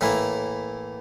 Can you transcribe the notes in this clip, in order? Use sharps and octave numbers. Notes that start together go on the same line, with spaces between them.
A2 E3 A#3 E4